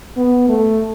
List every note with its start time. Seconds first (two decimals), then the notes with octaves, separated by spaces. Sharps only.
0.17 B3
0.49 A3